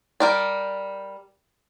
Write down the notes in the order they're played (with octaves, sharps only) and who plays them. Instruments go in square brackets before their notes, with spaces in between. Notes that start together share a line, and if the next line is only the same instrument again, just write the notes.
[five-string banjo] G3 A#4 D5